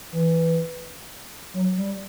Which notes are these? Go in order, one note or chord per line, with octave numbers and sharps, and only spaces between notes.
E3
F#3
G3